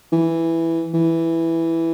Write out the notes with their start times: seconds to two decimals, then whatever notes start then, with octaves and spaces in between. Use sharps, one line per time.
0.12 E3
0.94 E3